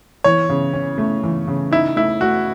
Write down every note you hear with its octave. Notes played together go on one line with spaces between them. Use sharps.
E3 C#5
C#3
C#4
A3
E3
C#3
D#4 E4
A3 E4
A3 F#4